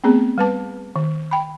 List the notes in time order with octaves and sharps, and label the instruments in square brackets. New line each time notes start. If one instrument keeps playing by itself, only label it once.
[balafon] A3 B3 C4 G#4
G3 B4 A5
D#3
G5 B5